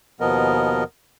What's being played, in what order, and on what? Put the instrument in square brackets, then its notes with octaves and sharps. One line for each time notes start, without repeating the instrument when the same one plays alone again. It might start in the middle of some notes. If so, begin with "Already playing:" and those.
[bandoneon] D#2 B2 F3 B3 A#4 D#5